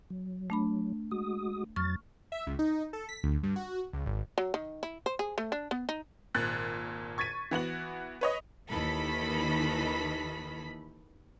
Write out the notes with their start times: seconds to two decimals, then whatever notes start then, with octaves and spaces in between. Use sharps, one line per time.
0.10 F#3
0.50 A3 D4 B5
1.11 G#3 F#4 D#6
1.76 F2 F#3 C#6 F6 A6
2.32 E5
2.47 C#2
2.59 D#4
2.93 A4
3.09 B6
3.24 D2
3.43 G2
3.56 F#4
3.93 C#2
4.06 G#1
4.38 F#3
4.54 D#3
4.83 E4
5.06 C5
5.19 G#4
5.38 A3
5.52 D4
5.71 B3
5.89 D#4
6.35 G#1 A#2 F#6 A6
7.18 C#6 G#6 A6 B6 D#7
7.51 E3 B3 F#4 F#7
8.21 B4 C#5 D#5
8.70 D#2 D#3 E3 A4 B5 B6